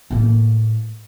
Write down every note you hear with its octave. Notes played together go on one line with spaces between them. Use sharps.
A2 A#3